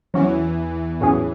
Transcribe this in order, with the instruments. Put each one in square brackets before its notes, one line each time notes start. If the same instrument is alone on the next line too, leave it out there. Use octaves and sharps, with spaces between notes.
[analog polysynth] E2 E3 [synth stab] F#3 C#4 F#4
[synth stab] A2 F#3 C#4 G#4